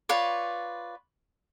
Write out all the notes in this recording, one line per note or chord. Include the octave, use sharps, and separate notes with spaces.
F4 B4 C#5 D5